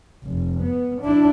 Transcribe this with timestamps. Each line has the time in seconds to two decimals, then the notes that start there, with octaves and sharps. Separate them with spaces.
0.24 F1
0.60 B3
1.02 D4 E4